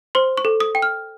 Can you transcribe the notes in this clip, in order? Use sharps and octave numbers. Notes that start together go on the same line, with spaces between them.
C5 C6
C#6
A4
D#6
G5
F6